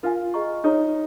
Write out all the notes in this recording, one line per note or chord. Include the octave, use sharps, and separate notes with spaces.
F4 A#4 F5 G#5
G#4 D#5 A#5 C#6
D#4 G#4 C#5 A#5